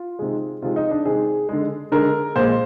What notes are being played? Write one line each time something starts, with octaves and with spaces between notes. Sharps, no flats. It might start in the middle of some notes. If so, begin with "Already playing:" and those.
Already playing: F4
C3 D#3 G#3
C3 D#3 G#3 F4
D#4
D4
C3 D#3 G#3 G#4
D3 G#3
D3 G#3 A#4
A#2 G#3 C5